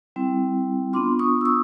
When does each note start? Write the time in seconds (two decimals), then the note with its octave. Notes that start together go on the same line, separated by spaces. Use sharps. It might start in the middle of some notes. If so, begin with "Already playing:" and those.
0.16 G3 C4 E4
0.93 B3 D4 F4 C6 D6
1.19 C#6 D#6
1.41 E6
1.45 C#6 D#6